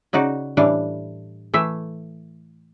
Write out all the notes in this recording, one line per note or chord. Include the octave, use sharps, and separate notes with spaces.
C#3 D#4 F#4 D5
A2 E3 G3 D4
E3 A3 E5